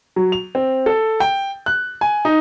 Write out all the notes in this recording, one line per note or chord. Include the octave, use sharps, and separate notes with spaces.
F#3
F7
C4
A4
G5
F#6
G#5
D#4